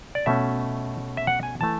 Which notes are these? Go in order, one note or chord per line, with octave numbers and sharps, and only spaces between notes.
D5
B2 A3 C#4 E5
E5
F#5
G#5
E3 A3 A5